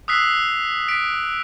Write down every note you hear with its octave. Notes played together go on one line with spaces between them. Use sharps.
D#6 E6 F#6 B6 C7
B6 D7